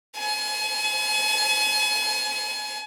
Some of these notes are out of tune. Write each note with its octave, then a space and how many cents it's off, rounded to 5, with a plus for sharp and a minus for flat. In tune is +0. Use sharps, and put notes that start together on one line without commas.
G#5 +40